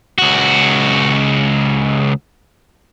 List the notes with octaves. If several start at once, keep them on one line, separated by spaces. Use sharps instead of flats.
C#2 F#4